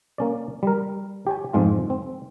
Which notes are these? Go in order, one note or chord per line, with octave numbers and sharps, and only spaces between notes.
A#3 C#4 D5
G3 A#4
G4 C#5 G#5
F2 G#2 G#3 F4
C4